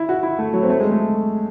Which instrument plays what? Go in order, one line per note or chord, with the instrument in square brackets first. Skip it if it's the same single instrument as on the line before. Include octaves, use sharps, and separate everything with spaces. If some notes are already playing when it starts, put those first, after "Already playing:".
Already playing: [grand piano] E4
F#4
E4
A3
F#3
C4
A3
G#3
A3